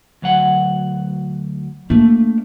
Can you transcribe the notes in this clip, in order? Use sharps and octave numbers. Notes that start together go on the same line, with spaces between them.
D2 F#3 F#5
A3 A#3 D4